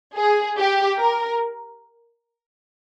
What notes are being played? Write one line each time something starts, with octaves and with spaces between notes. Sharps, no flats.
G#4
G4
A#4